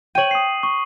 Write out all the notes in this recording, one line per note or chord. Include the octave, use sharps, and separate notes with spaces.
C#5 G5 D#7 F#7
D#6 C7
C#6